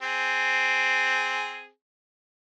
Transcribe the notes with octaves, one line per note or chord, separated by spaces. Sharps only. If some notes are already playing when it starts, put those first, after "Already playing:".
C4 G#4